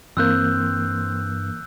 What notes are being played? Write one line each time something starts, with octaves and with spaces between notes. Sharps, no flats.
G2 E3 A#3 C4 E6 F#6 G6